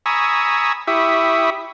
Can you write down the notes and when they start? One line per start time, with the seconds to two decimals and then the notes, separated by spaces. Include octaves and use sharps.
0.06 G#5 A#5 B5 C#6 D#6 E6
0.87 E4 G4 E5 B5 C#6 D#6